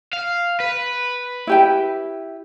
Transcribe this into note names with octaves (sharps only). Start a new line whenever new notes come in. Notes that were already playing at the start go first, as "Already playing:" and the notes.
F5
B4
E4 G4 G5